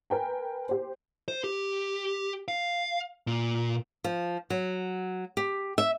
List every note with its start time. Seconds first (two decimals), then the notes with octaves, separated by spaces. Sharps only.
0.10 A#4 B4 G5 G#5
0.69 G4 C5
1.28 C5
1.44 G4
2.48 F5
3.27 A#2
4.04 F3
4.50 F#3
5.37 G4
5.78 E5